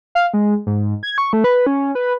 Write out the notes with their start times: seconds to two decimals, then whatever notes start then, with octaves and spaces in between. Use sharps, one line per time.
0.15 F5
0.34 G#3
0.67 G#2
1.03 G#6
1.18 C#6
1.33 A3
1.44 B4
1.66 C#4
1.95 B4